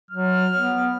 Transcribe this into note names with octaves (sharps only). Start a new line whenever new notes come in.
F#3 F6
B3